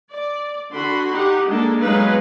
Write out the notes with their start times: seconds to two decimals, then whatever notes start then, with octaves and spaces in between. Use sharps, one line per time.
0.11 D5
0.72 D3 F#4 B5 C6
1.12 D#4 G4 F#5
1.47 G#3 A#3 D4 A4
1.78 F#3 G#3 B3 D#4 B4 F5